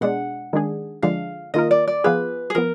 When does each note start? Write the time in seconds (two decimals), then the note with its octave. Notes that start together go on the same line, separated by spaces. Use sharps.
0.01 B2 G#3 D4 F#5
0.53 D#3 G#3 D4 G#4
1.03 D3 F3 G#3 D4 F5
1.54 D#3 A#3 F4 A#4 D#5
1.71 D5
1.88 D5
2.04 F3 B3 F4 G#4 B4
2.50 G#4
2.55 F3 B3 A#4